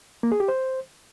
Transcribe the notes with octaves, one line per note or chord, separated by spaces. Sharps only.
A#3
G#4
G4
C5